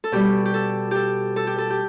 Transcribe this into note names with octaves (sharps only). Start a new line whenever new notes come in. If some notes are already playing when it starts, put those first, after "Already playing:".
A4
B2 G3 G4
G4
A4
G4 A4
A4
G4
A4
G4